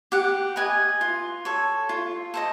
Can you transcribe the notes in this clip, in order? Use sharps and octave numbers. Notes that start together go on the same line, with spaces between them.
G4 F#5
B4 D#5 G#5
F4
A4 C#5
F4
A4 C5 D#5